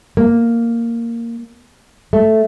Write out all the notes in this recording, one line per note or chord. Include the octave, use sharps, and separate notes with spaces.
A#3
A3